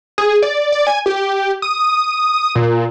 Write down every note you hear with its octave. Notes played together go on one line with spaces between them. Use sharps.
G#4
D5
D5
G#5
G4
D#6
A#2